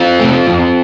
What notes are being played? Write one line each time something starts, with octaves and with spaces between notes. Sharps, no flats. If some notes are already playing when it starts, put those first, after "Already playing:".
Already playing: C4 F4
C3 A3
F2